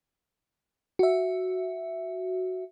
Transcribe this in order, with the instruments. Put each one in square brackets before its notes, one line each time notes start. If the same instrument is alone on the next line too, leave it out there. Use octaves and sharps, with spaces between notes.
[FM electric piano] F#4 E5